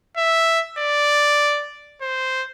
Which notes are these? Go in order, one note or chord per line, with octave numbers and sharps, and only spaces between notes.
E5
D5
C5